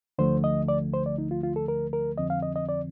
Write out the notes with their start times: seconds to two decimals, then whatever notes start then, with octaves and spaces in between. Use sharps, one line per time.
0.18 D2 D3 F3 A3 C5
0.44 D#5
0.68 D5
0.94 C5
1.06 D5
1.18 D#4
1.31 F4
1.43 F4
1.56 A4
1.68 A#4
1.93 A#4
2.18 F2 D3 F3 C4 D#5
2.30 F5
2.42 D#5
2.56 D#5
2.69 D5